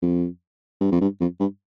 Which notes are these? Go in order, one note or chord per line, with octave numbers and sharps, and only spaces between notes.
F2
G2
F2
G2
F2
G2